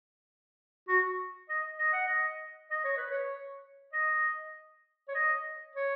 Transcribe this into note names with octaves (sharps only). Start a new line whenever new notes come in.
F#4
D#5
D#5
F#5
D#5
D#5
C#5
B4
C#5
D#5
C#5
D#5
C#5